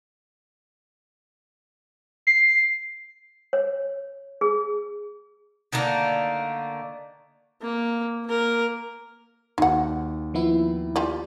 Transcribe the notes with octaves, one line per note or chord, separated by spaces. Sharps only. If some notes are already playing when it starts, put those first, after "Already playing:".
C7
C#5
G#4
D3 D#3 A3 A#3
A#3
A#3 A#4
D#2 F#3 F#5
F3 B3 E4
F4 G4 D5